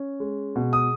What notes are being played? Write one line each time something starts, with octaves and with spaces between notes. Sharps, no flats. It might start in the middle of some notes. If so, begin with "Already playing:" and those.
Already playing: C#4
G#3
B2
D#6